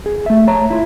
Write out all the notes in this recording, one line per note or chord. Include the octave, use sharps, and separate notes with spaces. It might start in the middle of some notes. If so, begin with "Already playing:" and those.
G#4
A3 E5
C#5 A5 A#5
E4 F4